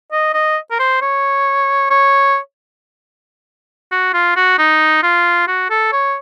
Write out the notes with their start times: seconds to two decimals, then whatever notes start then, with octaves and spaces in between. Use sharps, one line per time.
0.12 D#5
0.34 D#5
0.71 A#4
0.79 C5
1.01 C#5
1.90 C#5
3.92 F#4
4.14 F4
4.36 F#4
4.58 D#4
5.03 F4
5.48 F#4
5.70 A4
5.92 C#5